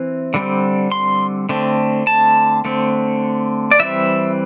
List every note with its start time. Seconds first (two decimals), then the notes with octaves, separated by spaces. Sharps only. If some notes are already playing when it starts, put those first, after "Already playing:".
Already playing: E3 C4
0.34 D3 G3 C4
0.92 C6
1.49 D3 A3 C4
2.07 A5
2.65 D3 A3 C4
3.71 D5
3.80 E3 G3 C4 E5